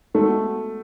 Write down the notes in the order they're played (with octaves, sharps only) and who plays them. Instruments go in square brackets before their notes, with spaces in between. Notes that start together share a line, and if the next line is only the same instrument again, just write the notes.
[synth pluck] G#3 B3 F#4 A4 [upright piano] A3